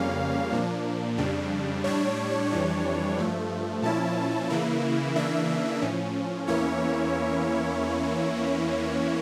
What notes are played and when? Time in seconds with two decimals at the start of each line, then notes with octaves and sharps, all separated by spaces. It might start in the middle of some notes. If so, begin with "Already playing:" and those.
Already playing: F2 C#3 G3 A#3 C#4 F5
0.52 A#2 F3 A#3 D4
1.18 F2 C#3 G3 D4
1.84 A2 G3 D4 C#5
2.50 F2 E3 G3 D4 C#5
3.17 G2 F3 A3
3.82 A#2 F3 C#4 E4 A5
4.50 C#3 E3 A#3 E4
5.16 C#3 E3 A#3 D4 E5
5.82 A2 F3 C#4
6.47 E2 E3 A#3 C#4 E4 C#5